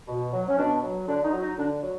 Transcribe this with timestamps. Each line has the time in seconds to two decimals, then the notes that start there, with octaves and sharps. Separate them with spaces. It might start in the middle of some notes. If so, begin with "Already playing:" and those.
0.08 B2
0.33 F#3
0.49 C#4
0.58 B2 D4
0.83 F#3
1.08 D3 D4
1.24 D#4
1.33 F#3
1.42 D#4
1.58 D3 D4
1.82 F#3